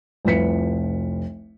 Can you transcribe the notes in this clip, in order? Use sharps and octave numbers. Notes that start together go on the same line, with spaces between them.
F1 C2 F4 B4 B6 C#7